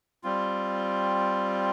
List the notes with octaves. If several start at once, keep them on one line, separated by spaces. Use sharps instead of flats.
G3 C4 F4